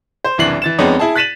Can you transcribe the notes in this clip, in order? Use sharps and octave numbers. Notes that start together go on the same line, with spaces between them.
C5
F#1 C2 E3 D4 C7 F#7
E3 A6 E7
F2 G#3 B3 C#4 D#4 D5
E4 G#4 A5
F#6 A6 B6 D#7 E7 F#7